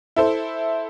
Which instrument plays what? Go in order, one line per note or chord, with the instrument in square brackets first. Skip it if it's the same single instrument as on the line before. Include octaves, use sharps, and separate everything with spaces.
[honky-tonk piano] E4 A4 C5